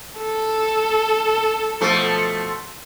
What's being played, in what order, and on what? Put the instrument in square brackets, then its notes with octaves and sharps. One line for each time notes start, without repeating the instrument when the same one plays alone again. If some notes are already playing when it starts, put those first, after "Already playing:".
[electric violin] A4
[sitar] B2 F3 A3